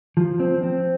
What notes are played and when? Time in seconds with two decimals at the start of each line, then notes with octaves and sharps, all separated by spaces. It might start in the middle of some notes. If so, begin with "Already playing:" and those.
0.17 F3
0.40 C4
0.63 C4